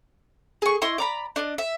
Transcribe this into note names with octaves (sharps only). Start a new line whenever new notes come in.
G#4 C#6
E4 D#5 C6 C#6
D5 A#5 B5
D4 D5 D#5
E5